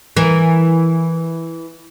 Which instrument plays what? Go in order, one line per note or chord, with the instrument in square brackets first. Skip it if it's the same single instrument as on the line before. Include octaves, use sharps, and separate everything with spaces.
[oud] E3 A#4